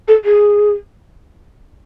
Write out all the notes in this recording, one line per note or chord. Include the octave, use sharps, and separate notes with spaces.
A4
G#4